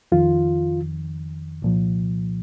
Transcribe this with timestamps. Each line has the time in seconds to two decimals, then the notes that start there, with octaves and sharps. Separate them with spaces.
0.12 F2 D#3 F4
1.62 C2 A#2 F3